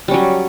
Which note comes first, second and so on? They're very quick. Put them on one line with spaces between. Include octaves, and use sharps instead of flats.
G3 C#4 F#3